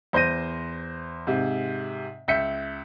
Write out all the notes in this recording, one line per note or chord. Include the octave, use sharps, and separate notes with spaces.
E2 C5 G6 A#6 D#7
G#2 C3
C#2 E5 G6 B6 C#7